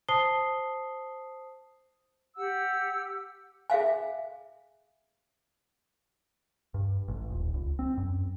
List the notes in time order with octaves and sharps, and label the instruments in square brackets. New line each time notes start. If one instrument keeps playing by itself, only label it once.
[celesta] C5 A5 D#6 C7 G7
[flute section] G4 F#5 E6
[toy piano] G#4 E5 F5 G#5
[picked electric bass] G2
A1
D#1
C#2
C4
F#2